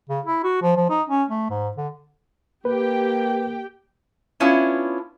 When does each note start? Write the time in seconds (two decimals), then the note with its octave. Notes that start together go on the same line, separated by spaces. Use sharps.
0.09 C#3
0.26 E4
0.44 F#4
0.62 F3
0.76 F3
0.90 D#4
1.09 C#4
1.29 A3
1.50 G#2
1.77 D3
2.65 A#3 G4 B4 G5
4.40 B3 C#4 D4 E4 F4